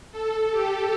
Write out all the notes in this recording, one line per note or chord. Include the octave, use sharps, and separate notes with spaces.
A4
G4